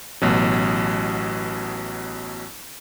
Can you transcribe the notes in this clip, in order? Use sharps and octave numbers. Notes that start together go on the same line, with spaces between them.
A1 B2 F#3